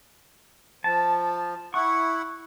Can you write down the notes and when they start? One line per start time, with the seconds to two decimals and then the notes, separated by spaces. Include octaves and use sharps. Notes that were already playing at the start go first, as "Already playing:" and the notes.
0.84 F3 A5
1.74 E4 F#5 C#6